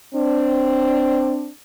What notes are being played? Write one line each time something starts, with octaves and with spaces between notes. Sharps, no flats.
C4 D4